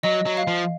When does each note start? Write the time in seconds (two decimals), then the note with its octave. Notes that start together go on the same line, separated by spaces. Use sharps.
0.03 F#3 D#5
0.26 F#3
0.37 F5
0.47 F3